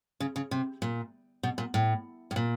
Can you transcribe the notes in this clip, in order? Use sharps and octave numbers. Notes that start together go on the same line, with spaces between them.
C#3
C#3
C3
A#2
B2
A#2
A2
A2
A#2